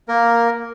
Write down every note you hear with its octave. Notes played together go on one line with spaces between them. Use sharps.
A#3 A#4